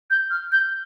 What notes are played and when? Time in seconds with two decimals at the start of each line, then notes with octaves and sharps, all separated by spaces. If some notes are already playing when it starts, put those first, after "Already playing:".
0.10 G6
0.31 F6
0.52 G6